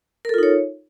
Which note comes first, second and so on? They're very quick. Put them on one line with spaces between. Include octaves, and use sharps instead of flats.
A#4 A4 F4 D#4 C#5